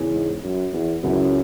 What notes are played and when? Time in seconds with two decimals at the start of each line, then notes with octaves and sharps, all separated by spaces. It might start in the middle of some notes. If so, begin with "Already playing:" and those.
Already playing: E2 C#3 E3 C#4 G#4
0.14 G#2
0.44 F#2
0.73 E2
1.03 C#2 F#2 C#3 F#3 E4 G#4